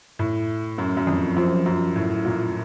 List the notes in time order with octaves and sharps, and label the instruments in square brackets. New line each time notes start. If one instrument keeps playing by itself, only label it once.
[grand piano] A2
F#2
F#2
F2
[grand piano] F#2 [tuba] F3
[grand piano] F#2
A2
A#2